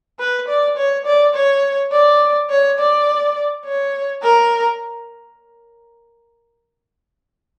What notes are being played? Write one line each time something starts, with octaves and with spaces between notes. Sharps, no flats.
B4
D5
C#5
D5
C#5
D5
C#5
D5
C#5
A#4